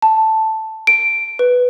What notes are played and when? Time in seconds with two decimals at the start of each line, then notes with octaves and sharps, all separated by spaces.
0.02 A5
0.87 D7
1.39 B4